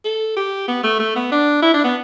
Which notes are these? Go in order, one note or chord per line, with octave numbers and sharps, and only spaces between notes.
A4
G4
B3
A3
A3
B3
D4
E4
D4
B3